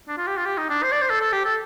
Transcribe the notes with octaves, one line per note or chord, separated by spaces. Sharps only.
D4
F4
G4
F4
G4
D#4
D4
C5
D5
C5
A4
A4
G4
A4